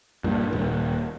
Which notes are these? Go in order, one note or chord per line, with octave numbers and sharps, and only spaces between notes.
G2 A#2
D#1